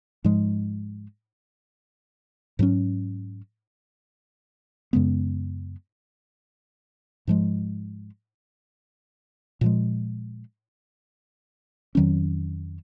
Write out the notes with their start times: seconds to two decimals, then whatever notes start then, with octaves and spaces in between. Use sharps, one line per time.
0.24 G#2 F3 G#3
2.59 G#2 F#3 C#4
4.93 F#2 C#3 G#3 B3
7.27 G#2 F3 G#3
9.61 A#2 F3 G#3
11.95 F2 D#3 F#3 C#4